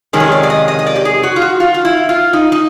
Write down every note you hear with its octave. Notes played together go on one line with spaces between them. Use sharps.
F2 C3 D#3 G#3 C#4
C#5
D5
D5
D#5
D#5
D#5
D5
G4
G#4
F#4
F4
F#4
F4
F4
E4
F4
D#4
D#4